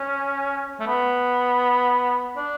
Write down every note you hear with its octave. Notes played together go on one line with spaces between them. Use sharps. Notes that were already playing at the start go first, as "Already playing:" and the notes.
Already playing: C#4
A3
B3
D4